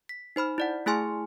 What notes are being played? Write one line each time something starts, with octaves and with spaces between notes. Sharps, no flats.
B6
D#4 C5 B5 F6
E4 D5 F#5
A3 E4 G#4 G#5 C6 F6